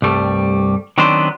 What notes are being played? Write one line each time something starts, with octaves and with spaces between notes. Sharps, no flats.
C2 G2 G3 A3
D#3 F#3 B3 C4 D4 C5